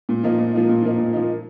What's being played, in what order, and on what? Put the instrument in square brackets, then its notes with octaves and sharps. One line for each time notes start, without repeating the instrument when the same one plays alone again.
[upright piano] A#2
F3 A#3 D#4
A#2
F3 A#3 D#4
A#2
F3 A#3 D#4
A#2
F3 A#3 D#4